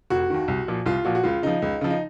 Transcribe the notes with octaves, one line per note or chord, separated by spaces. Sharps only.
F1 F#4
D#2 D#3
C2
A#2 F3
C2 F4
A#2 F3 F#4
F#4
C#2 F4
C#3 F3 D#4
C#2
C#3 F3
D#4